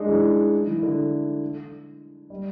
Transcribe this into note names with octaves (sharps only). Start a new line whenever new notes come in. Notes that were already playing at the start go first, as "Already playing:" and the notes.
Already playing: G#3 D4 D#4
E3
E3
D3
G3